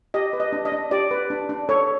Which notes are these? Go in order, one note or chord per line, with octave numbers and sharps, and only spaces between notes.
G4 D#5
B4
D#5
D4
D#5
D4
G4 D5
B4
D4
D4
A4 C#5